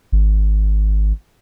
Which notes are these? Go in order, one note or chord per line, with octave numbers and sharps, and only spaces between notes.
G#1